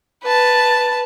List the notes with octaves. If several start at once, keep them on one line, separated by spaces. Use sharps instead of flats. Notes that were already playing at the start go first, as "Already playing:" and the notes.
B4 A5